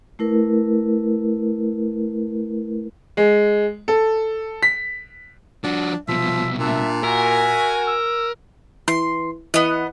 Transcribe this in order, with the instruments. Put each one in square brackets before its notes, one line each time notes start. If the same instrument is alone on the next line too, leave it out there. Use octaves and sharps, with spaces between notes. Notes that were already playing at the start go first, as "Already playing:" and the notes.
[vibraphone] A3 E4 A#4 B4
[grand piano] G#3
A4
B6
[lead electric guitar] F3 F#4 [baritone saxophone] D4
[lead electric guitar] C2 B2 [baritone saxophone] F3 [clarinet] E5
[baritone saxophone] A#2 [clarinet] D4 [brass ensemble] E5
[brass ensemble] F#4 G#5 [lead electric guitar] A#4 [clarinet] E5
[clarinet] E6
[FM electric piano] E3 [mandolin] C6
[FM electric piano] E3 F#5 [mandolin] B3 D#5